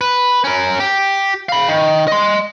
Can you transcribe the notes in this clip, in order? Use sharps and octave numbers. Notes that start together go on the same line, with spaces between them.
B4
C#4 A#4
G4
F5 B5
D#3
D#5 C6